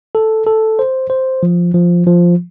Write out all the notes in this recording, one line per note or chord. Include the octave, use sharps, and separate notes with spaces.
A4
A4
C5
C5
F3
F3
F3